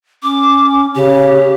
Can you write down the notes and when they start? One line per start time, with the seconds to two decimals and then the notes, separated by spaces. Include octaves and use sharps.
0.23 C#4 D6
0.95 C#3 G4